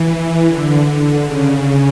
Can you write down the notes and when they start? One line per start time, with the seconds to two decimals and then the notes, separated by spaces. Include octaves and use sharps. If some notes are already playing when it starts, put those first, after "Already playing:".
Already playing: E3
0.46 D3
1.25 C#3